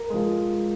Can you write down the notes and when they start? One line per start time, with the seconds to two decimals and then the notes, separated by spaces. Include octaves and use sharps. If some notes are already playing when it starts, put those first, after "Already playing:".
Already playing: A#4
0.10 F3 G#3